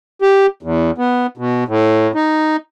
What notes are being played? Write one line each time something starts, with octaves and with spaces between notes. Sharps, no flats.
G4
E2
B3
B2
A2
D#4